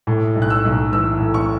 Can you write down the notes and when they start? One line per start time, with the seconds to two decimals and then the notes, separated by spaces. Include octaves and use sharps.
0.07 A2
0.35 B1
0.42 F#6
0.50 E6
0.65 B1
0.92 E3 E6
1.20 A2
1.34 C#6